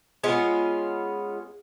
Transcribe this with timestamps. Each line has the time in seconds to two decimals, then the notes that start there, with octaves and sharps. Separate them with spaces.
0.23 G#3 B3 C#4 F4